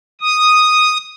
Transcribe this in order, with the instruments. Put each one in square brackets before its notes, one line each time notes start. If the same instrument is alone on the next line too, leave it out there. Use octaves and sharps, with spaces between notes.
[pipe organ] D#6